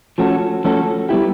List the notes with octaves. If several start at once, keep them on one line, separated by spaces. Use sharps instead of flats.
F3 A3 C#4 F#4 A4
F3 A3 C#4 F#4 A4
G3 B3 E4 G4